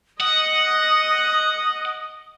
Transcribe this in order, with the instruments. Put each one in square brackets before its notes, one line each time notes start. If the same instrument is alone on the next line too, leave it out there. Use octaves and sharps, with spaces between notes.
[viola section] D#5 [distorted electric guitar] F#5 [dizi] D#6